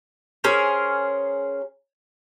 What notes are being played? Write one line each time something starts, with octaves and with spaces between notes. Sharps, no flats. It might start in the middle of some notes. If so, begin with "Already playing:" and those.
C#4 G#4 A#4 C5